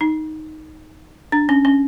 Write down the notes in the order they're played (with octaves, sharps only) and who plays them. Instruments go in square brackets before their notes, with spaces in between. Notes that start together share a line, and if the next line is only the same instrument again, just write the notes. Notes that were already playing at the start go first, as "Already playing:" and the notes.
[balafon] D#4
D4
C#4
C#4